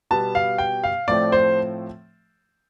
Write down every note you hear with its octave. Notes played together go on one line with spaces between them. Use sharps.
B2 G3 B3 A5
F5
G5
F5
A2 F3 A3 C4 D5
C5